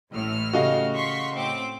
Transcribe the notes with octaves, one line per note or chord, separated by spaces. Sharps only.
A1 A2 F6
C#3 F#4 G4 A4 D#5 F5
C6 C#6 B6
A2 C4 D6